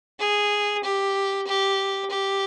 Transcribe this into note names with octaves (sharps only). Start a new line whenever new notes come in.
G#4
G4
G4
G4